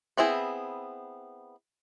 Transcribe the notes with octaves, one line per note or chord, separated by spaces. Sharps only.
B3 C4 E4 G#4